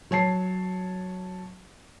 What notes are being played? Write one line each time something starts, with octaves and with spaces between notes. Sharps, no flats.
F#3 C#5 A5 C7